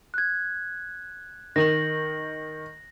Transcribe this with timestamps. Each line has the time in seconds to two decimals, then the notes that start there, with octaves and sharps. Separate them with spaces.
0.14 F#6 G#6
1.56 D#3 A#6 F#7